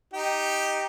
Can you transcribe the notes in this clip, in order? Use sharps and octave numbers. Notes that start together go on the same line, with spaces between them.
D#4 G4